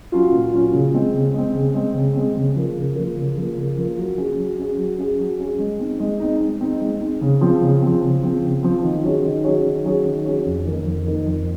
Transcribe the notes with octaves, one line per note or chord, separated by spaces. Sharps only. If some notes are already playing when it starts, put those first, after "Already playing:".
F#3 C#4 F4
A#2
F#3 C#4 F4
C#3
G#3 C4
C#3
G#3 C4
C#3
G#3 C4
C#3
G#3 C4
C#3
F3 A#3
C#3
F3 A#3
C#3
F3 A#3
C#3
F3 A#3
F#3
C#4 G#4
F#3
C#4 G#4
F#3
C#4 G#4
F#3
C#4 G#4
G#3
C4 D#4
G#3
C4 D#4
G#3
C4 D#4
G#3
C4 D#4
C#3
F3 C4
C#3
F3 C4
C#3
F3 C4
C#3
F3 C4
D#3
F#3 C#4 G#4 C#5
D#3
F#3 C#4 G#4 C#5
D#3
F#3 C#4 G#4 C#5
D#3
F#3 C#4 G#4 C#5
F2
D#3 A#3 D#4
F2
D#3 A#3 D#4
F2